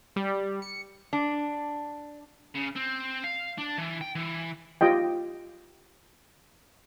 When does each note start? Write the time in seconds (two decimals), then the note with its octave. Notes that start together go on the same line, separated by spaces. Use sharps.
0.16 G3
0.62 C#7
1.13 D4
2.55 C#3
2.75 C4
3.24 F5
3.58 D4
3.78 E3
4.01 G5
4.16 E3
4.81 F4 G4 D#5 G5